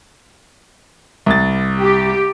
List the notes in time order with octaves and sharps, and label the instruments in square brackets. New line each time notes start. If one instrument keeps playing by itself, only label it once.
[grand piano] C2 A6
[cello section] G4